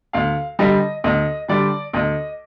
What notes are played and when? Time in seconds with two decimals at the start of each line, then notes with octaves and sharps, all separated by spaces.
0.13 D2 F5
0.59 D3 G3 D#5
1.04 D2 D#5
1.48 D3 G3 D5
1.93 D2 D#5